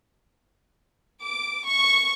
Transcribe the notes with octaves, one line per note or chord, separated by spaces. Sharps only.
D6
C#6